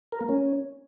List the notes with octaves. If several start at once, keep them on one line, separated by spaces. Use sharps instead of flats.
A#4
A#3
C#4